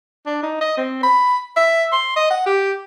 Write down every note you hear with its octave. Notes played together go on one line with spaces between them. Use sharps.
D4
D#4
D#5
C4
B5
E5
C6
D#5
F#5
G4